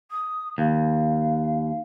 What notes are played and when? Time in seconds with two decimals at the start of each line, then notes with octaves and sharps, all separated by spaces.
0.11 D#6
0.58 D#2 F5